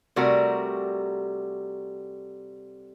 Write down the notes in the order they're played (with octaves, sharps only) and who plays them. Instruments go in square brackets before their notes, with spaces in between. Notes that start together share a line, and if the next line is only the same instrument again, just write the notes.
[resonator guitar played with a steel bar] C3 G3 A3 F#4 A#4